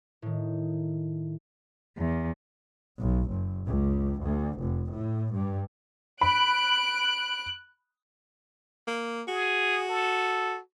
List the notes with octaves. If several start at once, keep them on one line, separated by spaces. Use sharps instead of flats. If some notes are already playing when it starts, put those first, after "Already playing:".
A2 D#3
E2
B1
F#1
C#2
D2
F1
A2
G2
B5 F#6 D7
A#3
F#4 G#4
A4